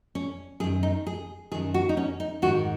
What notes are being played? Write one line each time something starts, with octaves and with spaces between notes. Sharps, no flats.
C#4
F#2 D#3 G#4
D#4
G#4
F#2 D#3 G#4
F#4
D#4
C#4
D#4
G#2 D#3 F#4